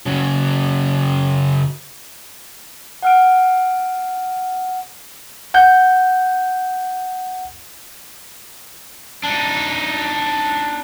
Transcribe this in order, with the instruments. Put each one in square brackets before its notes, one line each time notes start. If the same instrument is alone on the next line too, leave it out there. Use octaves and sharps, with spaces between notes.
[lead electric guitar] C#3 F#3
[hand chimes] F#5 F6 D7
[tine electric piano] F#5 G6
[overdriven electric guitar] D4 D#4